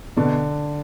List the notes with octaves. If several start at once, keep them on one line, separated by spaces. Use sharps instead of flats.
B2 D3